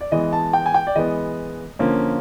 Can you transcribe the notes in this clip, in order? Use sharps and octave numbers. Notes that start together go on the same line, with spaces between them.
D5
E3 G#3 B3 D#5
A5
G5
G#5
G5
D5
E3 G#3 B3 D#5
D3 F3 A#3 C#4